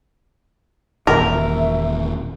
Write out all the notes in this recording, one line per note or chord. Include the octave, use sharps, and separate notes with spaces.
E1 A#2 D#3 A#4 E5